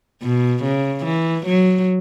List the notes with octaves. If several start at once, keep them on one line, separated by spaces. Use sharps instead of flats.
B2
C#3
E3
F#3